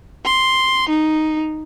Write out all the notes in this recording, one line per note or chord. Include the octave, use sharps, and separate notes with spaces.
C6
D#4